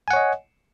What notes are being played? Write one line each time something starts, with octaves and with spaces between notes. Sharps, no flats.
C#5 D#5 F#5 G#5